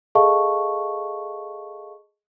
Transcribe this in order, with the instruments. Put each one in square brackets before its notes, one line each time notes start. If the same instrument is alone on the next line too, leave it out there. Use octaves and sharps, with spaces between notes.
[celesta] G#4 A4 D#5 F5 A5 C#6